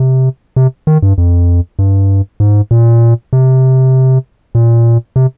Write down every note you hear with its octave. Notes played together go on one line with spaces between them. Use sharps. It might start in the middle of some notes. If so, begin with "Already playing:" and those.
Already playing: C3
C3
D#3
G2
F2
G2
G#2
A#2
C3
A#2
C3